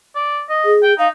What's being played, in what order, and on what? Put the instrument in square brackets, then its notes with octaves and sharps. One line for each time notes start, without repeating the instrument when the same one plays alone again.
[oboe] D5
D#5
[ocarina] G#4
[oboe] G5
[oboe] D#4 [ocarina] F5